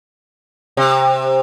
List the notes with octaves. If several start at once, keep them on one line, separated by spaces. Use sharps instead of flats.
C3